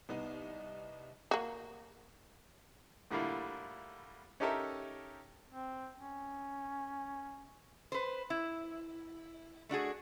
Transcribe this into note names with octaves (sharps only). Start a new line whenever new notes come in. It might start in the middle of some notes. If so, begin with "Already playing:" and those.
C2 B3 D#4
A#3 F#4
A2 D3 G3 A#3 E4 F4
C#4 D#4 G4 A4 A#4 E5
C4
C#4
B4 C5
E4
A3 D4 F#4 G#4